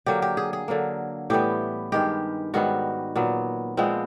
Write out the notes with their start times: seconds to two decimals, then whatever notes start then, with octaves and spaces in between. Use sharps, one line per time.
0.06 D3 F#3 A#3 G4
0.22 G4
0.37 G#4
0.53 G#4
0.68 D3 F#3 A#3
1.30 A2 E3 G3 B3 G4
1.92 G2 D#3 G#3 G4
2.54 G#2 D#3 G3 B3 F#4
3.16 A#2 F#3 B3
3.77 A#2 F3 G#3 B3 C4